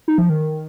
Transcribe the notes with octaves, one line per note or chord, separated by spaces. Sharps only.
D#4
F3
D#3